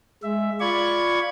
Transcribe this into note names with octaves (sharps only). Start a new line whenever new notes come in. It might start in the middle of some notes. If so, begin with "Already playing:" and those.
G#3 E5
F4 D5 B5 C#6 G#6